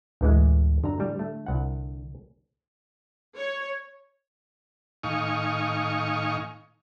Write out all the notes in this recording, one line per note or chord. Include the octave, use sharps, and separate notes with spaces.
A1 D2 E3 G#3
F#2 D3 A#5
A2 G3
A3
C2 F#5
C#5
A2 D#3 D#4 F5 G#5 C#6